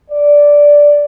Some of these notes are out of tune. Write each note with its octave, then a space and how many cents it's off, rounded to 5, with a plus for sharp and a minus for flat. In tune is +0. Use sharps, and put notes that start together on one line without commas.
D5 -5